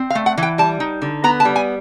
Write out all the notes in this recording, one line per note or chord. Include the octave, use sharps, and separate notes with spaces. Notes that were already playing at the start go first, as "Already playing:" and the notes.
Already playing: C4
F5
A3
F#5
E3
G5
G3 A5
D#4
D3
B3 A#5
A5
G3
G#5